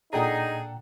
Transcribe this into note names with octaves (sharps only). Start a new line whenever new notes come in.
A#2 D4 D#4 G#4 A4 F#5 G5 A#5